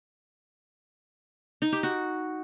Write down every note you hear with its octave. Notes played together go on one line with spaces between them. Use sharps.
D#4
G4
F#4